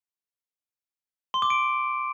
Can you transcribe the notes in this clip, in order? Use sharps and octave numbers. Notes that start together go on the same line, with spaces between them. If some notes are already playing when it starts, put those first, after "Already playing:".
C6
D6
D7